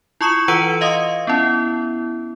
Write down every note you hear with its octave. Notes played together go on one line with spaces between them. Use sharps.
E4 F4 C#6 D#6 C#7 E7
E3 F4 B4 F#5 C#7 D#7
D#5 F5 C6 D#6
B3 C#4 E4